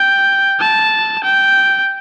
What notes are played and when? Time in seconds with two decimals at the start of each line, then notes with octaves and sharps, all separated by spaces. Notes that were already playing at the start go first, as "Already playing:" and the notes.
Already playing: G5
0.60 A5
1.24 G5